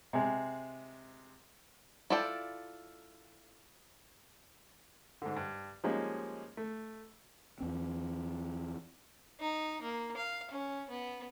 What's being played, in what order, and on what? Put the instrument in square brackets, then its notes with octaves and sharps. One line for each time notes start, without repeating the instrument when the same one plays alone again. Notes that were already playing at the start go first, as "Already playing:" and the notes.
[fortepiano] C3 G#3
[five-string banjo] E4 F4 A4 D5 G5
[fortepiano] G#2 D3
G2
F3 G3 G#3 A#3 C#4 D#4
A3
[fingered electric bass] E2 C4
[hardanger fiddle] D#4
A#3
F5
C#4
B3